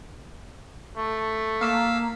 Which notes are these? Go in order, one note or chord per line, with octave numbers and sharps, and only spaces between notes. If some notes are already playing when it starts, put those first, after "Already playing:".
A3
A#3 F5 E6 B6